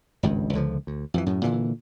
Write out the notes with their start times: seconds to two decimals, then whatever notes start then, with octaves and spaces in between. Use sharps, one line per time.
0.23 G#1 C#2 G2
0.53 C#2 D3 F3
0.87 D2
1.14 F2 D#3 E3
1.26 F#2 A2
1.43 A#2 D3 E3